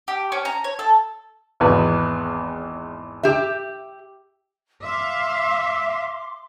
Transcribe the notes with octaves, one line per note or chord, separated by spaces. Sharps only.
G4
C#4
A#5
C#5
A4
G#1 E2 B4
G4 E5
E5 F5 C6 D6